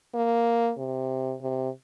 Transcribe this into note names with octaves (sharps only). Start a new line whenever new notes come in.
A#3
C3
C3